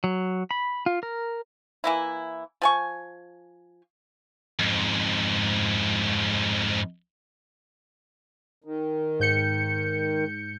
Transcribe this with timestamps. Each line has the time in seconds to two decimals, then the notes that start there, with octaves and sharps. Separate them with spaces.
0.04 F#3
0.51 B5
0.86 F4
1.03 A#4
1.84 E3 A#3 E4
2.62 F3 G#5 C#6
4.59 F2 G#2
8.64 D#3
9.20 G#2 G6 C#7